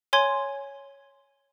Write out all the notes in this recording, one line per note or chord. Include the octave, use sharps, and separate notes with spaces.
C#5 G#5 C6 G#6